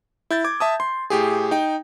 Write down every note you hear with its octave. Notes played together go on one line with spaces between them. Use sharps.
E4 G6 A6
D6 G#6
E5 A5 D#6
C6
A2 G4 G#4
D#4 G5